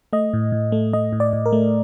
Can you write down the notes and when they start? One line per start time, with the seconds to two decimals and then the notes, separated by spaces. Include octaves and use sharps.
0.13 A3 D#5
0.33 A2
0.52 A2
0.72 A3
0.93 A3 D#5
1.13 A2
1.20 D5
1.33 A2
1.46 A#4
1.52 A3